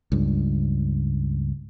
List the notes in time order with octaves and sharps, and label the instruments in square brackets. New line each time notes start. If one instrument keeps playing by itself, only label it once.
[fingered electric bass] C#2 G2